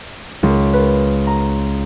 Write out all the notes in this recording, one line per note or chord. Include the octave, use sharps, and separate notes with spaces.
C#2
B4
A#5